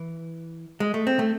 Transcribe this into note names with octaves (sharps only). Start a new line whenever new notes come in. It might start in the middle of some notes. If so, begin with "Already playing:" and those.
Already playing: E3
G#3
A3
C4
A3